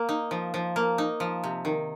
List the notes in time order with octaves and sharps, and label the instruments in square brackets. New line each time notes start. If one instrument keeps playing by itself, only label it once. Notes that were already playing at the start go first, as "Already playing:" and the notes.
Already playing: [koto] A#3
D#4
F3
F3
A#3
D#4
F3
C3
D#3